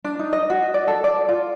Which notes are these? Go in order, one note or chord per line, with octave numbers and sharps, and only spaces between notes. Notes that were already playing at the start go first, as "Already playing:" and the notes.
D4
D#4
D#5
F#4
D5
A4
D5
F4